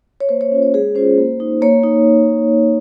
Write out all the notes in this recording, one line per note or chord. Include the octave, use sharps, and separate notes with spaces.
C#5
A#3 C5
C#5
C#4 F4
C#5
G#3 G#4
C#4 F4 C5
A#3
D#4
A#3 C#5
D#4